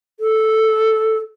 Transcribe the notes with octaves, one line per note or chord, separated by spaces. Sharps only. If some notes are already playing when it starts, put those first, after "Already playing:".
A4